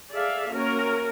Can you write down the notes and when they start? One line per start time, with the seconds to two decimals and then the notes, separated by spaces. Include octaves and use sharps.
0.11 G#4 A4 D5 E5 F5
0.51 A#3 C#4 F#4 A#4 C#5